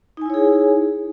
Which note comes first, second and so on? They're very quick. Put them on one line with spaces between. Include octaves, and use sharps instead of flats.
D#4 G#5 E4 C#5 G#4